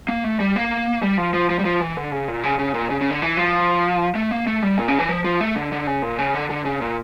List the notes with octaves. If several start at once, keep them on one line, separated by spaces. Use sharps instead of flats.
A#3
A3
G3
A#3
G3
F3
F3
F3
G3
F3
E3
D3
C#3
A#2
C#3
C#3
A#2
C#3
C#3
D3
E3
F3
A3
A#3
A3
G3
A#2
C#3
E3
F3
F3
A3
D3
D3
C#3
A#2
C#3
D3
D3
C#3
A#2